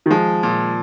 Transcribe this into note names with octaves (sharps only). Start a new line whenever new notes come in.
D#3
F3 G#3
A#2